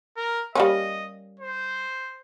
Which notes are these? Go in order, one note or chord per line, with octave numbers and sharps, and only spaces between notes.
A#4
G3 A#3 C#4 D#5
C5